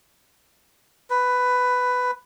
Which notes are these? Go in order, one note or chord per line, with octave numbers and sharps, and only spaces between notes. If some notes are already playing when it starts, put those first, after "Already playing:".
B4